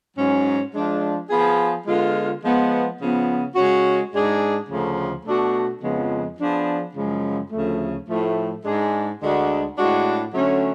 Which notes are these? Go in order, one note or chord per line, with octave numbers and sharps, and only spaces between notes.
G#2 F#3 C#4
F3 G#3 D4 F4
F3 B3 F4 G#4
D3 G#3 B3 F4
F3 G#3 B3
C#3 F3 B3
C#3 G#3 C#4 F#4
G#2 G#3 D4 G#4
D2 C#3 F3 A3
B2 A3 D4 F#4
F2 C#3 F3 G#3 B3
F3 B3 D4 G#4
F#2 C#3 F3 G#3
D2 C#3 F3 A3
A2 F3 A3
G#2 G#3 D4 G#4
D2 D3 G#3 D4 F#4
A2 G#3 D4 F#4
D3 F#3 A3 C#4